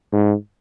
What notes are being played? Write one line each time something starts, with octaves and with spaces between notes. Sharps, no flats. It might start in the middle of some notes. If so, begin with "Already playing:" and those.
G#2